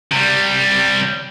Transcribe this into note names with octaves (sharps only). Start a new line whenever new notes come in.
C3 G3